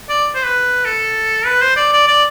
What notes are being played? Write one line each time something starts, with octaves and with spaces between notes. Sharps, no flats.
D5
C5
B4
A4
B4
C5
D5
D5
D5